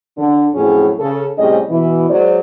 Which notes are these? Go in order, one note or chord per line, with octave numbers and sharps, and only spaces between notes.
D3
F2 A2 F#3 C#4 G#4
C#3 A4
A2 C3 G3 C#4 G#4 D#5
B2 E3 E4
F#3 G#3 C5 D5